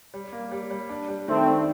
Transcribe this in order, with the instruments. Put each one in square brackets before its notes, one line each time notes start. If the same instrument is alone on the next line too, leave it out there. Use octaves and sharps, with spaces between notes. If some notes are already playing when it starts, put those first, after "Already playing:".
[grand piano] G3
A#3
G3
G3
D4
G3
[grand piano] D#3 [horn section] A3 C4
[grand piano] D4